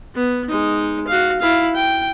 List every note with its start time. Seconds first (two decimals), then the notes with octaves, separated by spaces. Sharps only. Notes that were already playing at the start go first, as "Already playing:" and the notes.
0.15 B3
0.48 G#3 D#4
1.07 F#4 F5
1.40 E4 F5
1.75 G5